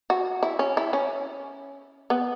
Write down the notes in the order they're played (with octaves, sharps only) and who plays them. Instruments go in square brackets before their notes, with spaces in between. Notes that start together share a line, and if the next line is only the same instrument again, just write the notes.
[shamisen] F#4
E4
C#4
E4
C#4
B3